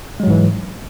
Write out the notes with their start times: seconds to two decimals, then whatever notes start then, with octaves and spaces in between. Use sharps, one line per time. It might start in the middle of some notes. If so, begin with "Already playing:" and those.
0.20 G#3
0.23 F#3
0.27 G#2
0.30 E3